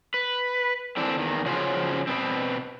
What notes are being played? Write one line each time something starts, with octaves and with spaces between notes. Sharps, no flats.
B4
D3 E3 C4 D4
E2 D#3
C#3 F3 F#3 C#4 C5
B2 B3 C4